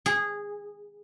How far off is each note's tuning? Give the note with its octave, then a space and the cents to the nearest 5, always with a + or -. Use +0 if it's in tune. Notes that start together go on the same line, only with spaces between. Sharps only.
G#4 -15